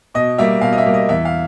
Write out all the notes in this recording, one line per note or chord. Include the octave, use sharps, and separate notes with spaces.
B2 D#5
G3 A#3 E5
B2 F5
D#5
E5
G3 A#3
D#5
E2 E5
F5